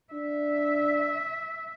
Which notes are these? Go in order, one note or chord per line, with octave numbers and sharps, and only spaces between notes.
D4 E5